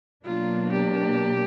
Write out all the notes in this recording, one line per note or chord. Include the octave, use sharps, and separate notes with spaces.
B2 F#3 A#3 D4 F4
G4